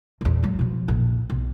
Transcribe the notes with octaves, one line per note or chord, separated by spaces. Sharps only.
A#1 E2
G#1 F#3
B2 F3
A#1 F2
B1